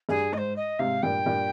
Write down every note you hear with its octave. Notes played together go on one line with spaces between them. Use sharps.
G2 G#4
G#2 D#5
C5
D#5
G#2 C3 F5
G2 A#2 G5
G2 A#2